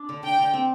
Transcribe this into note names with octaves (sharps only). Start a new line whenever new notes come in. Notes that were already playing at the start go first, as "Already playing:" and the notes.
Already playing: D4
D3
D3 G5
D3
C4